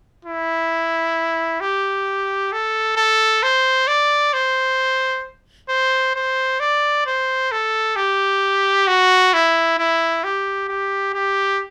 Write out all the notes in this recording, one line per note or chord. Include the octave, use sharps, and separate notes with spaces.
E4
G4
A4
A4
C5
D5
C5
C5
C5
D5
C5
A4
G4
F#4
E4
E4
G4
G4
G4